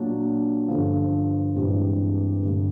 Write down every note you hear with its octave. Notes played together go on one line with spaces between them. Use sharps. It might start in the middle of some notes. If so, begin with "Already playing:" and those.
Already playing: A#2 F#3 A#3 D4 F4
G2 D3 F3
G2 E3 G#3 C4
G2 D3 G3